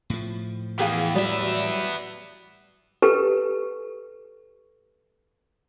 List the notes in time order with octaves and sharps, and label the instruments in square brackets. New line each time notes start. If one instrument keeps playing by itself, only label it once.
[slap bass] A2 F3
[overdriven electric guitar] E3 B3 [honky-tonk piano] G4 G#4 F5
[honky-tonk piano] F#3 G3 D5 [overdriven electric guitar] B3 E5
[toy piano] G4 A4 B4